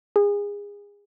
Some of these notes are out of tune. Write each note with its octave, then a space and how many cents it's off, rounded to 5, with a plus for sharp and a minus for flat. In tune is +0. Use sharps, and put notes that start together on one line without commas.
G#4 -30